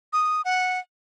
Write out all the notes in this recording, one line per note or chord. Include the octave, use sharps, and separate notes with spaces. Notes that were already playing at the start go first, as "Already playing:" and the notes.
D#6
F#5